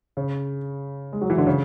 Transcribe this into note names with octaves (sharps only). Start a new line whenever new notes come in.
C#3
G#3
F#3
E3
D3
C#3